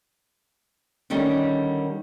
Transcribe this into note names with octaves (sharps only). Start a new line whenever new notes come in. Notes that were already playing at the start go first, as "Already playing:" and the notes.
D3 D#3 G3 A#3 C#4 D#4